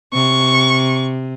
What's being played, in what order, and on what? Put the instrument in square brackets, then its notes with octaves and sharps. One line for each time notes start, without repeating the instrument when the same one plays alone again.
[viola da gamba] C3 [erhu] C#6